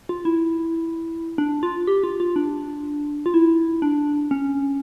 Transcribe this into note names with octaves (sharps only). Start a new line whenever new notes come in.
F4
E4
D4
F4
G4
F4
F4
D4
F4
E4
D4
C#4